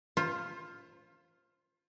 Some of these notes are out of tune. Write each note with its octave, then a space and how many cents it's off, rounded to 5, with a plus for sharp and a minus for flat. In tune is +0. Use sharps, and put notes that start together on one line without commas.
F4 +0 C5 +30